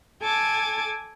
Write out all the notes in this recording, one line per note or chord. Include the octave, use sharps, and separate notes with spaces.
A4 G#5 D6 G#6